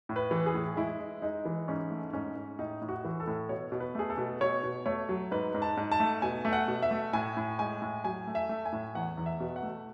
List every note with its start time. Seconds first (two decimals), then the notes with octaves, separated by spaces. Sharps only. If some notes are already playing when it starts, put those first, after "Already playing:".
0.09 A2
0.16 B4
0.31 E3
0.46 G#4
0.54 A2
0.76 G#3 E4
0.99 G#3
1.22 G#3 D#4
1.45 E3
1.68 G#2 C#4
1.91 A3
2.13 G#2 C#4
2.36 G#2
2.59 A2 D#4
2.81 A2
2.89 F#4
3.05 E3
3.20 A4
3.27 A2
3.49 B2 C#5
3.72 B2
3.80 B4
3.95 A3 G#4
4.10 A4
4.18 B2
4.41 B2 C#5
4.64 B2
4.86 A3 C#5
5.09 F#3
5.31 G#2 B4
5.54 G#2
5.62 A5
5.77 G#2
5.92 A5
6.00 A3
6.22 B2 G#5
6.45 A3
6.53 F#5
6.68 B2
6.82 E5
6.91 A3
7.13 A2 G#5
7.37 A2
7.59 G#3 G#5
7.82 A2
8.04 F#3 G#5
8.27 A3
8.35 E5
8.49 A3
8.66 G#5
8.72 A2
8.95 E2 F#5
9.17 E2
9.26 E5
9.40 B2
9.56 F#5
9.63 A3